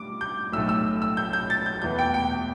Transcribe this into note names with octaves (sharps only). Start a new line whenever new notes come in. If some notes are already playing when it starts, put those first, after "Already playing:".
Already playing: G2 D6
G6
B1 A2 A3 E6
E6
E6
G6
G6
A6
G6
E2 E3 B3 G6
G5
G5